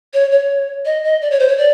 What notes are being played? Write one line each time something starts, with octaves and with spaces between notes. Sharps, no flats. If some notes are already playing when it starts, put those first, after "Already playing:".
C#5
C#5
D#5
D#5
D5
C#5
C5
C#5
D5